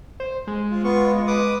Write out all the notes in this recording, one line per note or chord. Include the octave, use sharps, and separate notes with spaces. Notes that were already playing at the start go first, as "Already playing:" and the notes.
C5
G#3
F4
B3 F4 C#6
B4 D6 D#6